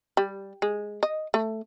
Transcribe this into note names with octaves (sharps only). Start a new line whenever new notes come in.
G3
G#3
D#5
A3